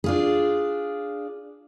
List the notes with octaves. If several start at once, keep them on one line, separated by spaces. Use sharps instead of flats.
D4 F4 G#4